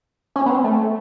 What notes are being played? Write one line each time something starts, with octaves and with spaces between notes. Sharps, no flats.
C#4
B3
C4
A3